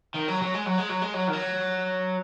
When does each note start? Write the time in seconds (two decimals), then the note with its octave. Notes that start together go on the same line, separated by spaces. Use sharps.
0.14 D#3
0.28 F#3
0.42 F#3
0.54 G#3
0.66 F#3
0.78 G#3
0.89 F#3
1.01 G#3
1.14 F#3
1.28 D#3
1.33 F#3